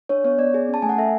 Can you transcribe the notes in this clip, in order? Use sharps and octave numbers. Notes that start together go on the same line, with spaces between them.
D4 C#5
B3 C#5
B3 D5
G#4
C#4 A5
A3 G#5
F#5
A4 E5